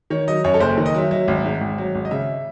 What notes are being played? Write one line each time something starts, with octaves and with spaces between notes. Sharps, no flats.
D#3 C#5
F#3 D#5
F#2 C#5
A4
F#1 C5
D#3
D#5
F#3 E5
F#3 E5
G#1
G#2
G#1
F#3
G#1
D#5
C#3 E5